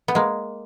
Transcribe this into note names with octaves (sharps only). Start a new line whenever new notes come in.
B3
G#3 A#3